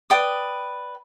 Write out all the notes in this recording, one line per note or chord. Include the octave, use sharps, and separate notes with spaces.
B4 D5 G5 D#6